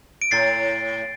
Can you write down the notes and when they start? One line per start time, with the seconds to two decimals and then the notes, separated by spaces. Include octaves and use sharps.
0.22 D7
0.31 A2 A6 C7